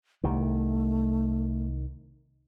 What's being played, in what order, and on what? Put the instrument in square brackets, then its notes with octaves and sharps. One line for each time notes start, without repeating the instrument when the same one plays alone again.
[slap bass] C2 D#3 [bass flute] A3